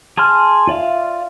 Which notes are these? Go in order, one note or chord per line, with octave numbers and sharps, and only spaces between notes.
G#4 A5 C6 F6
F4 D5 E5 F5